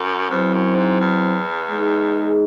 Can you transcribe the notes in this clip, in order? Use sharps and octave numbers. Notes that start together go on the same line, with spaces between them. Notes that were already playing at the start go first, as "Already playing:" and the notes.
Already playing: F#2
E2 F#3 C4 E4 C5
F#2
G#2
E2
G#3 D#4 G#4